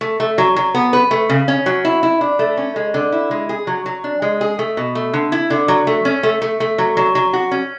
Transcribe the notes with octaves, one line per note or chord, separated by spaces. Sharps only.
A3
A3
F#3
F#3
B3
B4
A3
C#3
C#4
F#3
E4
E4
D4
A3
C#4
G#3
D3
E4
G#3
G#4
F#3
F#3
D4
G#3
G#4
A3
B2
A3
D3
E4
D3
F#3
A3
C#4
A3
A3
A3
F#3
F#3
F#3
F#4
C#4